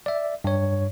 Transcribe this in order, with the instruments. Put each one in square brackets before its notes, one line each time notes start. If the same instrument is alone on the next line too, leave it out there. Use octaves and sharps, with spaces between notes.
[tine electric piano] D5 E5
G2 C#5